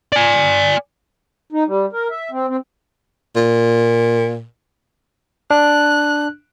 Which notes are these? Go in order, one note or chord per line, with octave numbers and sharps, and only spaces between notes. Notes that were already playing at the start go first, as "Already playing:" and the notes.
D5 G#5
D#4
G3
A#4
E5
C4
C4
A#2
D4 F#6